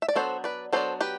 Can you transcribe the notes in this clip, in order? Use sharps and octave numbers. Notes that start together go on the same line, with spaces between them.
E5
D5
F#3 B3 D4 A4 C5
B4 D5
F#3 B3 D4 A4 C5
G4 B4